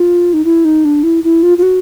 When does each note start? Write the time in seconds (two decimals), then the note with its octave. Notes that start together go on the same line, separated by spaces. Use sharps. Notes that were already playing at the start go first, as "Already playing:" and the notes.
Already playing: F4
0.34 D#4
0.45 E4
0.65 D#4
0.85 D4
1.03 E4
1.24 E4
1.43 F4
1.58 F4
1.63 F#4